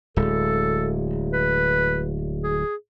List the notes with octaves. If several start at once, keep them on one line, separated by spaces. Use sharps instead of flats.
D1 G#3 A4
B4
G#4